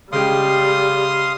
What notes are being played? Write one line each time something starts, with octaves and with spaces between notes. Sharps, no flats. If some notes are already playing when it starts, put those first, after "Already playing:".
C#3 G3 G#3 G4 F5 C6 D#6